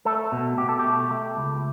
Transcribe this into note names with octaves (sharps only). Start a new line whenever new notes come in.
A3 A4
B2
B2 G4
A4
G4
A3
A3
C#2